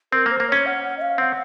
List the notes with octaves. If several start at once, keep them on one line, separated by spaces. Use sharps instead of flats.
C4 A#4
A#3
C5
A#3
C#4 C#5
F#5
F#5
D#5
F5
C4 F#5